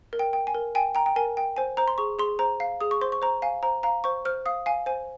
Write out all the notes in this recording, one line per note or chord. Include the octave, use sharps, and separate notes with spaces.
A#4
G5
G5
G#5
A#4
G5 G#5
G5 A#5
G5
A#4 G#5
G5
C5 G#5
C5 A#5
C6
G#4 C#6
G#4 C6
C5 A#5
F5
G#4 D#6
C#6
C5 C6
C#6
C5 A#5
F5 G#5
C5 A#5
F5 A#5
C5 C#6
C5 F6
F5 D#6
F5 G#5
C5 G#5